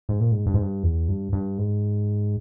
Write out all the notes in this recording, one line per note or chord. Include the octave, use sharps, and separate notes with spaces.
G#2
A#2
G#2
G2
G#2
G2
E2
G2
G2
G#2